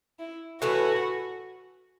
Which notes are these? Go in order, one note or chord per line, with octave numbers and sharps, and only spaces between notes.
E4
A2 E3 B3 F#4